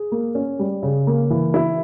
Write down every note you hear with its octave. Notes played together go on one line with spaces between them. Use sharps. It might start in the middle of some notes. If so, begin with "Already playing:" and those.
Already playing: G#4
A#3
C#4
G3
C#3
A#3
E3
E4